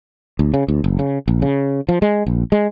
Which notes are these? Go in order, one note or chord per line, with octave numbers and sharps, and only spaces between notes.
D2
C#3
D2
F#1
C#3
A#1
C#3
F3
G#3
A#1
G#3